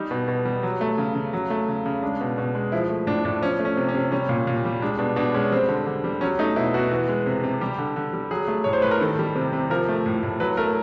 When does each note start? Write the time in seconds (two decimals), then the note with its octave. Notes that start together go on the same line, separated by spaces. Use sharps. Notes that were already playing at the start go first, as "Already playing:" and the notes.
Already playing: G3 D#4
0.11 B2
0.28 B2
0.45 G3
0.63 F#3
0.81 A3
0.98 C#3
1.15 C#3
1.33 F#3
1.50 A3
1.68 C#3
1.86 C#3
2.03 G#3 D4
2.21 B2
2.38 B2
2.55 G#3
2.72 F3 E4
2.90 A3
3.07 A2 D4
3.25 A2 D4
3.42 F3 C#4
3.60 A3
3.65 C#4
3.77 C3
3.88 C#4
3.95 C3
4.12 G3 C#4
4.29 A#2
4.47 A#2
4.65 G3
4.82 G#3 D4
4.99 B2 D4
5.16 B2 D4
5.34 G#3 C#4
5.52 G3 C4
5.69 D3
5.87 D3
6.04 G3
6.21 F#3 C#4
6.39 A3 D#4
6.56 B2 E4
6.74 B2 F#4
6.91 E3
7.09 G#3
7.26 C3
7.44 C3
7.61 G3 G4
7.78 D3
7.96 D3
8.13 G3
8.31 F#3 G#4
8.48 A3
8.64 A2 C#5
8.73 C5
8.82 A2 B4
8.91 A#4
9.01 D#3 A4
9.19 G3
9.36 C3
9.53 C3
9.70 F3 A#4
9.88 A3
10.06 A2
10.23 A2
10.40 F#3 B4
10.57 A3 A#4